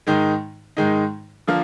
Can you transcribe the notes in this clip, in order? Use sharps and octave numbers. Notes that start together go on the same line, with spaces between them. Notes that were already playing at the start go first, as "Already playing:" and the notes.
G#2 D#3 G#3 D#4
G#2 D#3 G#3 D#4
D3 F3 A#3 F4